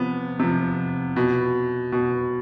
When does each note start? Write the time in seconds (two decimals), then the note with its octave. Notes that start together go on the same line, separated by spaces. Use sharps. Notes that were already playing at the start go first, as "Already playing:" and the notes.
Already playing: C3 F3 B3
0.39 C3 F3
1.16 B2
1.92 B2